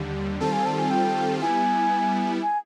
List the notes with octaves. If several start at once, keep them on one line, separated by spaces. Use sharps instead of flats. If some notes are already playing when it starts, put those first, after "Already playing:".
Already playing: D#2 D3 G3
D#3 G3 C4 F4 A4 A5
G#5
A5
G#5
G5
G3 B3 E4 G#5
G#5